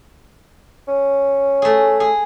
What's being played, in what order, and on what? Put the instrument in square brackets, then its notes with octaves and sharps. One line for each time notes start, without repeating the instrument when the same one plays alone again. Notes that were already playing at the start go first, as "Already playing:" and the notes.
[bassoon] C#4
[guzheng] A3 G#4
G#4